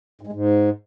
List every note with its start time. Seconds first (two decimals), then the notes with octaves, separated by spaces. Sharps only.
0.21 G#2
0.27 G#3
0.32 G#2